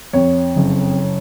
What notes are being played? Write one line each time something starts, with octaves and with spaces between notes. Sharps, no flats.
F2 C#5
F#1